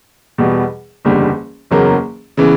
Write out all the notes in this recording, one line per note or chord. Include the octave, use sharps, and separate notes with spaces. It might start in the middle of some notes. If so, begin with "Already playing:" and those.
E2 B2 G3
F#1 E2 D3 G3
F#1 E2 C#3 F#3 A#3
C#3 E3 B3